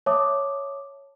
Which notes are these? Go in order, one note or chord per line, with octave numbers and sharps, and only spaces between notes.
C#5 E5 A5 D6 D#6